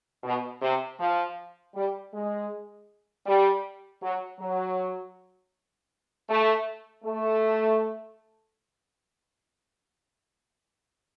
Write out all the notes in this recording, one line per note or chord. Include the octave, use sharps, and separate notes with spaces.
B2
C3
F3
G3
G#3
G3
F#3
F#3
A3
A3